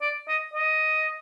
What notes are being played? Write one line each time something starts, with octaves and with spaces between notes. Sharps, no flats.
D5
D#5
D#5